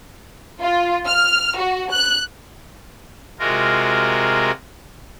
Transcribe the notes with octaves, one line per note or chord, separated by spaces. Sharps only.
F4
F6
F#4
F#6
C3 G#3 F4 F#4 A#4